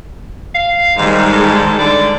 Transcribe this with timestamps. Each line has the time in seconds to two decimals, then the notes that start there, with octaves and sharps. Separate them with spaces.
0.55 F5
0.96 G#2 D#3 G3 G#3
1.33 A4
1.79 D3 D5